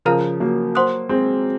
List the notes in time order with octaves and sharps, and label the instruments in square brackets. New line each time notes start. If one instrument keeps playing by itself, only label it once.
[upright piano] C#3 F3 [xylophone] A#4 F5 A#5 F6
[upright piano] F#3 A#3
[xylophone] C5 F#5 C6 D#6 F#6
[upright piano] G#3 C4